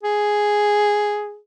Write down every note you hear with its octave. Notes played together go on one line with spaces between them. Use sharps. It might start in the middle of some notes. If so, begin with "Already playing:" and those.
G#4